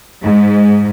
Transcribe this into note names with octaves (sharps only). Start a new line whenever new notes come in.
G#2